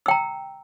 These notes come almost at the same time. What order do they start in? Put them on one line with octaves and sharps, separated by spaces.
E6 G5 A#5